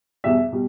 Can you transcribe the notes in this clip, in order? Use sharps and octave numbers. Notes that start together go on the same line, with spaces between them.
E2 B2 G3 E5
B2 G3